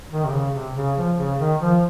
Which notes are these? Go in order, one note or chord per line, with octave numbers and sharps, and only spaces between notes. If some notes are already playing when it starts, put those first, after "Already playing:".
D#3
C3
C#3
C3
C#3
F3
C#3
D#3
F3